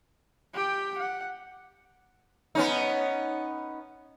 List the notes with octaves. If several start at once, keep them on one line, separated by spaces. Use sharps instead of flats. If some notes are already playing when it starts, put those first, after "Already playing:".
G4 G5
F#5
B3 C#4 D#4